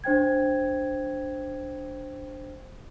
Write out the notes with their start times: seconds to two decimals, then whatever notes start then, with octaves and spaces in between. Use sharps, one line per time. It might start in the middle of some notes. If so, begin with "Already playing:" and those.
0.04 D4 C5 G5 G#6